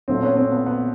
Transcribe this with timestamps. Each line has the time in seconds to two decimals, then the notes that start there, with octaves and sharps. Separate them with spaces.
0.08 B1 A#2 F#3 A3 C4
0.23 B3 C#4
0.37 C4
0.52 B3
0.66 B3